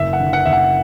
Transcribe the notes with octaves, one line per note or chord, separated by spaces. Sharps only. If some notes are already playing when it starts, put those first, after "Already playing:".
Already playing: F#1 E5
F#5
D3
F#5
F#1 E5
F#5